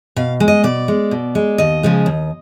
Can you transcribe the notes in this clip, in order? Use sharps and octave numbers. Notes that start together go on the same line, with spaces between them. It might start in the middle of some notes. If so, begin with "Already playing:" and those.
B2 F5
G#3
D#5
B2 D5
G#3
B2
G#3
D#2 D#5
C#3 F3 G#3
D#2